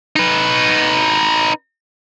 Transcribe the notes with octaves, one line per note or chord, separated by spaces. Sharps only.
D#4 B4